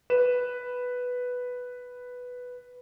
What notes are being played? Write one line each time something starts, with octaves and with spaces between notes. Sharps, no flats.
B4 E7